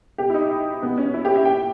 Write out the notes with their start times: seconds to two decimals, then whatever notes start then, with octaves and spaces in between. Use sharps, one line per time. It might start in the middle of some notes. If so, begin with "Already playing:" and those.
0.18 B2 G4
0.30 E4
0.34 D#4
0.82 B2 B3
0.98 C#4
1.14 E4
1.25 G4
1.36 E5
1.45 A#2 G5